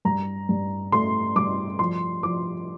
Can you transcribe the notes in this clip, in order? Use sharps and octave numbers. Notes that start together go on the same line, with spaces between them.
G2 A#5
G2
A3 C6
G2 D6
F3 C6
F3 D6